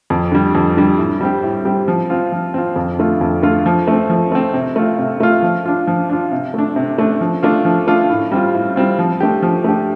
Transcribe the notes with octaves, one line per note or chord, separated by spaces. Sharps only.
F2
D3 G3
F2
D3 G3
A2
G3 C4 G4
A2
G3 C4 G4
F3
C4 F4
F3
C4 F4
F2
D3 A3 F4
F2
D3 A3 F4
F3
A3 C4
F3
A3 C4
C3
A3 F4
C3
A3 F4
F3
D4 F4
F3
D4 F4
C3
A3 D4
C3
A3 D4
F3
A3 D4 F4
F3
A3 D4 F4
A2
G3 C4 F4
A2
G3 C4 F4
F3
A3 D4 G4
F3
A3 D4 G4